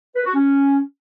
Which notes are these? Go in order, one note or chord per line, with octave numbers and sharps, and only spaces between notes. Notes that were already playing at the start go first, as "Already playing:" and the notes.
B4
F#4
C#4